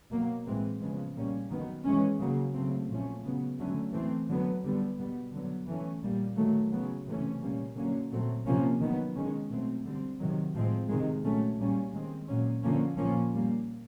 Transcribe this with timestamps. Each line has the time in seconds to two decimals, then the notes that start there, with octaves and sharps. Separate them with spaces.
0.11 B2 F#3 A#3
0.46 A2 E3 G#3 C4
0.81 C#3 F3 G#3 B3
1.16 A#2 G3 A#3 C#4
1.51 D#3 F#3 B3
1.85 E3 G#3 C#4
2.20 C#3 F#3 A#3
2.55 C#3 F#3 A3 C4
2.89 A#2 F3 A3 C#4
3.24 C#3 F#3 B3
3.59 D3 F#3 A3 C#4
3.93 E3 A3 C4
4.28 D3 F#3 B3
4.63 D3 G3 B3
4.98 B2 G3 B3
5.33 D3 F#3 B3
5.68 E3 A3 C#4
6.02 A#2 G3 A#3
6.37 D#3 F#3 A3
6.72 C#3 F#3 B3
7.07 C3 E3 A3 C#4
7.41 A#2 G3 A#3 C#4
7.76 D3 F#3 A#3 C#4
8.11 A#2 F#3 A3 C4
8.46 C3 F3 A#3 C#4
8.81 D#3 F#3 B3
9.15 D#3 G#3 C#4
9.49 B2 F#3 A3 C4
9.84 D3 G3 C4
10.19 C3 D#3 F#3
10.55 A2 F3 G#3 C4
10.89 C3 D#3 G#3
11.24 A#2 F#3 A3 C#4
11.59 A#2 G3 A#3 C#4
11.93 D#3 G#3 C4
12.28 A#2 F#3 A#3 C#4
12.63 D3 F3 A#3 C#4
12.97 A#2 F3 A#3 C#4
13.33 A#2 G3 A#3